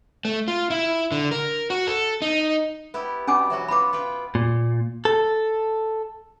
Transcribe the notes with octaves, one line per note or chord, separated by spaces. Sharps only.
A3
F4
E4
D3
A#4
F#4
A4
D#4
B3 E4 G4
B2 G3 C#4 G#5 D6
E3 F#3 F#4
B3 F4 B5 D6
F4 B4 G5
A#2
A4